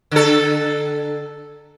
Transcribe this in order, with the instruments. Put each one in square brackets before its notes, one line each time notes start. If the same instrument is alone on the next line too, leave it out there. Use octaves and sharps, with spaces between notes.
[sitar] D3 A4